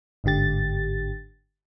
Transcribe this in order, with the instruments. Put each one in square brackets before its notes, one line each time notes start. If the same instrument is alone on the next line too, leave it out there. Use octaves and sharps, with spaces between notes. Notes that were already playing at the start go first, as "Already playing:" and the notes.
[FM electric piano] G1 G#2 D3 G4 A6